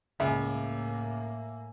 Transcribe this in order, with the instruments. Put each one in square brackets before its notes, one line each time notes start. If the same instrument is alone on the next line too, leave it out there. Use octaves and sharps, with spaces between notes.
[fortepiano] C#2 [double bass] A2 A#3 [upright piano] E5 G#5